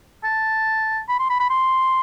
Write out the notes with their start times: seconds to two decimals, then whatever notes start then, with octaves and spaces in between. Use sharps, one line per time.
0.24 A5
1.09 B5
1.19 C6
1.30 B5
1.40 B5
1.50 C6